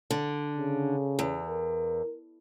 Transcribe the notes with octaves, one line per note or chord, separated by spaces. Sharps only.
D3
C#3
E2
A#4